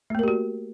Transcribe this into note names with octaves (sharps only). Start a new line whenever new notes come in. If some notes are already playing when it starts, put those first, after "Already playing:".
A3 A#3 F#4 G4 A#4